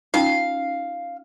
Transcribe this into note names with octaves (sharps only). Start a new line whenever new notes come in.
C#4 D#4 F4 F5